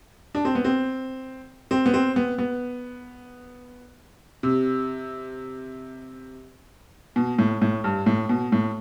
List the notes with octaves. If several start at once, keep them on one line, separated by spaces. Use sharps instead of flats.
D4
C4
B3
C4
C4
B3
C4
B3
B3
C3
B2
A2
A2
G2
A2
B2
A2